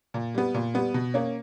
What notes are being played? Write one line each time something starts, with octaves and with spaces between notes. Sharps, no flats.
A#2
G3 B3
A#2
G3 B3
B2
A#3 C#4